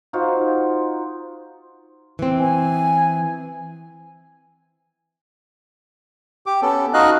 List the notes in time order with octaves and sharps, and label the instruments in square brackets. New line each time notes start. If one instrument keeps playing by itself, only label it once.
[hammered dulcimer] D#4 F4 F#4 C5
[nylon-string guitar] E3 C4
[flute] G#5
[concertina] G4 D6
B3 C#4 A4
D#4 F#4 D#5 F5 F#6